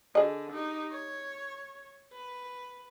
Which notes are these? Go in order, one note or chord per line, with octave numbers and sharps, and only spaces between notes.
D3 G#4 D#5
D#4 G4
C#5
B4